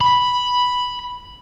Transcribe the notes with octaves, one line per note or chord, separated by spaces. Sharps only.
B5